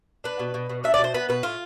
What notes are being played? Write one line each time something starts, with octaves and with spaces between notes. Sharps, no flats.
D4 B4
B2
B2
B2
D4 E5
D5
B2
C5
B3 B4
B2 B4
A2 F4